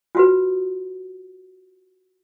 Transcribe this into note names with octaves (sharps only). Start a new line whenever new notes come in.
F4 F#4 B4